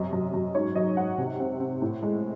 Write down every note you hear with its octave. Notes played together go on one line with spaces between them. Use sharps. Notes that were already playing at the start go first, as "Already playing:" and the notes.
Already playing: F#2 C3 D#5
F#2
F#2
G#2 C#5
F#3 D#5
G#2 F#5
C3
C4
C4
A2
G#3